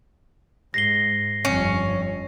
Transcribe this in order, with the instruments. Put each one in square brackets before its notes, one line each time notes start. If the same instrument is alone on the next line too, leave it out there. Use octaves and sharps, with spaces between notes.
[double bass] G#2 [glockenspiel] A#6 C7 G7
[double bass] G1 F2 [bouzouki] C#4